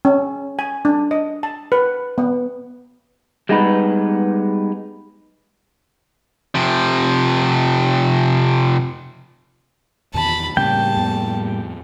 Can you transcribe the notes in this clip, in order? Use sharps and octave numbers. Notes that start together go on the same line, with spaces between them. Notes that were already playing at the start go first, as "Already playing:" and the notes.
C#4
G#5
D4
D#5
A5
B4
B3
G3 G#3 B3 D#4 B4
C3 F3
E2 A#2 D#3 A5 B5
A2 C#3 G3 A#3 C4 C#4 G5 A5
F2 B3